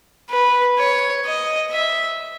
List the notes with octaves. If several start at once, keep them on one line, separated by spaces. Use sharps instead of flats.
B4
C#5
D#5
E5